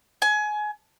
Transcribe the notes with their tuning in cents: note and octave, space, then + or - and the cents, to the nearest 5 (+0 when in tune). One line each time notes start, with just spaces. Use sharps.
G#5 +25